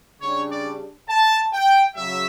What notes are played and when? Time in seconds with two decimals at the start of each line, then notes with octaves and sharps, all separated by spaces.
0.20 C#3 G3 D4 C#5
0.50 D5
1.08 A5
1.53 G5
1.96 C#3 F#3 E5